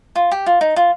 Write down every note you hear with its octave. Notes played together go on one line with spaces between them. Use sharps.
F4
G4
F4
D#4
F4